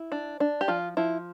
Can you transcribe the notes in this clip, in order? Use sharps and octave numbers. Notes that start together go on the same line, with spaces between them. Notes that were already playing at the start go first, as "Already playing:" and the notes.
Already playing: E4
D4
D4
G4
F3 F4
F3 E4